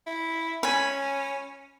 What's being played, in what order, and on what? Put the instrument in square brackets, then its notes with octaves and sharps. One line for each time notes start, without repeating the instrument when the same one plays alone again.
[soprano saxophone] E4
[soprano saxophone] C#4 [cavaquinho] G#5 B5